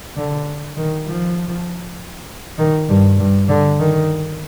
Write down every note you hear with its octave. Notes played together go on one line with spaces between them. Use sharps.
D3
D#3
F3
D#3
G2
G2
D3
D#3